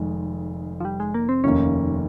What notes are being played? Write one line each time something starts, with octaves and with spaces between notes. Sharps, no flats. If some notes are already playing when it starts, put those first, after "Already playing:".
Already playing: F1 F2 D#3 G#3
F3
G3
G#3
A#3
C4
F1 D#2 D#3 A#3 C#4